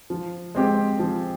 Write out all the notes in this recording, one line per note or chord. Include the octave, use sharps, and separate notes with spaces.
F3
G#3 C4 G4 C5
F3